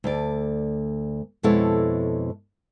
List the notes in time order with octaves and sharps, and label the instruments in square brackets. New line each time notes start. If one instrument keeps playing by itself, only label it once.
[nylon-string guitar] D2 D5
F2 B2 G#3 E4 A4 C#5